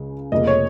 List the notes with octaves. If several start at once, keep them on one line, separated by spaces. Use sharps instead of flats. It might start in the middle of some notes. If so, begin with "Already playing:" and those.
Already playing: C#2 C#3
F1 F2 C#3 A#3 D#5
C#5